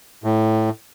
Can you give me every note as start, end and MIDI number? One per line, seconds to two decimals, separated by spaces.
0.24 0.70 45